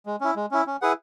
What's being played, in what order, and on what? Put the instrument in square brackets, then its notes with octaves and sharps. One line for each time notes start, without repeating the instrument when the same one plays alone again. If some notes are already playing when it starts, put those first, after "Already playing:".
[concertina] G#3
C#4 E4
G#3
C#4 E4
C#4
E4 G#4 B4 F#5